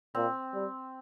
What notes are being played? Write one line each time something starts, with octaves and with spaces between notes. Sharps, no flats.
A#2 C4
G3